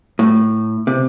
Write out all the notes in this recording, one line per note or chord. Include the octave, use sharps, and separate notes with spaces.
A2
C3